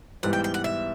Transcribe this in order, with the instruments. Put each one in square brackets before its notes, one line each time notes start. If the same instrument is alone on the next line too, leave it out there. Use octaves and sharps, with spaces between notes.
[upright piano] G#2 E3 G3 B3 [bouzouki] F#5
[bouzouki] G5
G5
F#5
E5